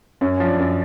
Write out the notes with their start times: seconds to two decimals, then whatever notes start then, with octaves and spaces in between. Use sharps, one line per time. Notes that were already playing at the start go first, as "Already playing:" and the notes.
0.21 F#2 C#4
0.37 F3 C#4
0.47 D4
0.59 F#2